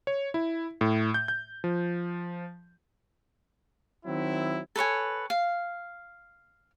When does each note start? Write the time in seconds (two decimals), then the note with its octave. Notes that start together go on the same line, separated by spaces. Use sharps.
0.07 C#5
0.34 E4
0.81 A2
1.14 G6
1.28 G6
1.64 F3
4.06 D#3 F#3 C4 E4
4.76 A4 B4 C#5 G#5
5.30 F5